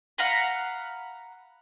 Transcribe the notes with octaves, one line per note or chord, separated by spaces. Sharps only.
F5 F#5 A#5 B5